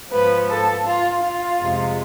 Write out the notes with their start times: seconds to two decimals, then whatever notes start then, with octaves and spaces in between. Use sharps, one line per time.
0.11 G#2 F3 B3 B4
0.48 A4
0.85 F4
1.23 F4
1.60 F2 C3 G#3